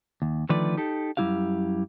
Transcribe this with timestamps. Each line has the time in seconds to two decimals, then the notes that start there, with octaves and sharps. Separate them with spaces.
0.22 D#2
0.49 D3 D#3 F3 A3 B4 D5
0.77 D#4 G4 A4
1.17 F#2 F#3 G3 E4 G4 F5